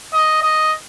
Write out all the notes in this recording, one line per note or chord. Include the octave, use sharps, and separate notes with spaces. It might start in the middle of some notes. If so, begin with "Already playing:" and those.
D#5
D#5